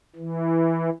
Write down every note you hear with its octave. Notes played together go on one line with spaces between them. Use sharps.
E3